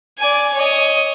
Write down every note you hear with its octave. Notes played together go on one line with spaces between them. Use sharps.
D5 G#5
C#5 D#5